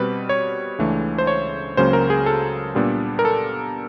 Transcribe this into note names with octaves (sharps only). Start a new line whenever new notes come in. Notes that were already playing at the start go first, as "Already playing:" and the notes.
Already playing: B2 G3 C4 B4
C#5
C#2 C#3 E3 A3 D4
C5
C#5
C#2 C#3 F#3 A#3 C#4 C5
A#4
G#4
A4
A#2 G3 B3 D4
A#4
A4